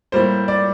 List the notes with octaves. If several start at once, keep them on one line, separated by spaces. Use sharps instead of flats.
A2 G3 A#3 C5
D5